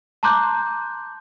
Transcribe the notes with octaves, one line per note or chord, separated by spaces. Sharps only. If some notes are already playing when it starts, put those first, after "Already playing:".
A5 A#5 C6 D6 F#6 G6